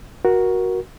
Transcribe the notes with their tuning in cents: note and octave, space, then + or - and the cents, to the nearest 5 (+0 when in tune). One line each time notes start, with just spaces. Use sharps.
F#4 +0 A#4 +15